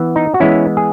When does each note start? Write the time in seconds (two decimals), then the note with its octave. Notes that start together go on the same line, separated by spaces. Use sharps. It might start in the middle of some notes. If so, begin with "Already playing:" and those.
Already playing: E3 B3
0.16 D#4
0.34 F#4
0.40 E3 G#3 B3 C#4 E4
0.77 G#4